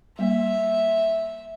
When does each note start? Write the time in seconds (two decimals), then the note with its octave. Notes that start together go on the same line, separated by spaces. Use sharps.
0.19 G3 A#3 E5